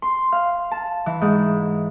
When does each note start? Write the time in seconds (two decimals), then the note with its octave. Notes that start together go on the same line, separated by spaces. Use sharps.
0.02 C6
0.32 F5
0.71 A5
1.06 E3
1.21 G#2